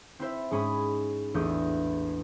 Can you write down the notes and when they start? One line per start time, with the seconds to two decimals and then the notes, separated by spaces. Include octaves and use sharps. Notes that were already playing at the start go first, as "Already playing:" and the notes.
0.19 C4 E4 C5 E5
0.51 G#2 G#3 C#4 G#5 B5 D#6
1.34 A1 E2 A3 D4 D#6 G6